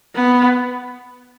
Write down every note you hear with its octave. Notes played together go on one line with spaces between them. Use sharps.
B3